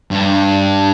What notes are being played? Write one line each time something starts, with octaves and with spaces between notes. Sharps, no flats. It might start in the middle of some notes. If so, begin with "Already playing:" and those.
G2